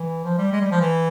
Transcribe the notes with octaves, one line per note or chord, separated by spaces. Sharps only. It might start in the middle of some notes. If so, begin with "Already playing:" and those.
Already playing: E3
F3
G3
G#3
G3
F3
E3